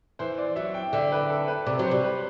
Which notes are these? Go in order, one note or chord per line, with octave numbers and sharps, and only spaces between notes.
E3 C5
D5
F#3 E5
G5
D3 E5
B4
A4
B4
C3 D5
F#3
C5
G3
B4